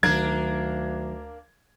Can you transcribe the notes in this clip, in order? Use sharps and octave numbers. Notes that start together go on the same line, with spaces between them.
D2 D#3 F#3 A#3 D4 A#4 G#6